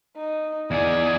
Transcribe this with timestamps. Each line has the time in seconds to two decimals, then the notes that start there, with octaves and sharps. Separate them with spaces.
0.17 D#4
0.71 E2 G#4 D5